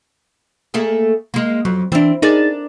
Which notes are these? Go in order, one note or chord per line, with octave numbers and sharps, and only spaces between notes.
A3 A#3 G#4
G#3 A#3
F2 F#3
E3 C4 D4 E4
D4 D#4 G#4 A#4 D5 A6